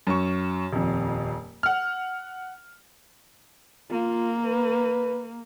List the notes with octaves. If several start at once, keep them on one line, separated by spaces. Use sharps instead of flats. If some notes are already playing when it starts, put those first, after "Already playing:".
F#2 C#6
D#1 F2
F#5 F6
A#3 F4
B4